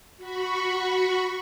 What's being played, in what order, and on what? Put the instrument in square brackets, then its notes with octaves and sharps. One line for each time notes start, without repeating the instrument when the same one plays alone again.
[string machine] F#4 B5 C#6